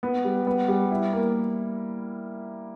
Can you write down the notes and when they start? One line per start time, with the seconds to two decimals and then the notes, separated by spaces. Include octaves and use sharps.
0.03 B3
0.24 G3
0.47 B3
0.68 G3
0.91 E4
1.13 A#3